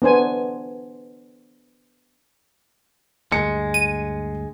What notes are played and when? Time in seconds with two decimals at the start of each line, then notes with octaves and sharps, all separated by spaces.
0.02 B3 D4 C5 G#5
3.32 D2 G2 G#3 C#7
3.74 D#7